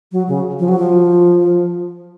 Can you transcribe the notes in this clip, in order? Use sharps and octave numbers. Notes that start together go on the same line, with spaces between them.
F#3
C#3
F3
F#3
F3